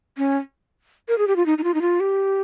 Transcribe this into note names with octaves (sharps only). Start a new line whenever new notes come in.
C#4
A#4
G#4
G4
F4
D#4
D#4
F4
D#4
F4
G4